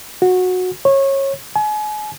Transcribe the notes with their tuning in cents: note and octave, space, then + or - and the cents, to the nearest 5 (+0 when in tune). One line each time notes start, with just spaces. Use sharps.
F#4 -15
C#5 -25
G#5 +35